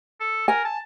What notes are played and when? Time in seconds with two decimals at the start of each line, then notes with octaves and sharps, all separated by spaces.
0.21 A4
0.48 A#4 G#5
0.65 A5